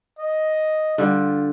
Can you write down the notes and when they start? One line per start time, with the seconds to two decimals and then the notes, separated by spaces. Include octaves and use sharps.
0.19 D#5
0.98 D3 G3 F4